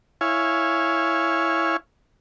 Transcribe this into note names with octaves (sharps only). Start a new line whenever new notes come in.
E4 C#5 F5 G#5